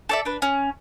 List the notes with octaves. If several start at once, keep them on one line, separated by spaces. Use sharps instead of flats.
A4 D5 E5
D4 B4
C#4